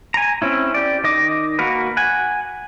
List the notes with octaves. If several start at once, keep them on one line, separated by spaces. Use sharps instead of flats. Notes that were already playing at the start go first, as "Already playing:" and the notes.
G#5 A#5
C4 C#4 E4
G4 D5
D#3 D#5 D6
A#3 F#4 A#4 B4
F#5 G#5